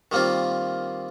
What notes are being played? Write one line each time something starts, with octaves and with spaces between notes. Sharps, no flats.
D#3 G3 A#3 C4 F4